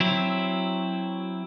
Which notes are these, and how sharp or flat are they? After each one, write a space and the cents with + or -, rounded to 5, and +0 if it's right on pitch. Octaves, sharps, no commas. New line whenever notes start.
F#3 +0 C4 +0 E4 +0